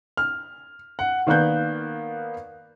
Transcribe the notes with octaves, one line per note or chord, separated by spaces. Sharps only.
F6
F#5
D#3 A#3 B3 D5 F#6 G6